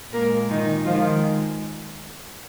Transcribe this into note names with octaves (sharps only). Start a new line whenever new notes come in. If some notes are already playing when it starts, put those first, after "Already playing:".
A#2 G#3 A#3 A#4
D#3 D#4
D#3 F3 G#3 F4